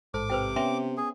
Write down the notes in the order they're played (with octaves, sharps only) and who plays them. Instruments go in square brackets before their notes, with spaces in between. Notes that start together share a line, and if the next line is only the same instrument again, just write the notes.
[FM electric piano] A1 G#2 A4 [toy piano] C5 [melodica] D6
[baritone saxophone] C3 [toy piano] B4 C5 G5
[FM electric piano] B3 C#4 [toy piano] E5 G5 C6
[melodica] G#4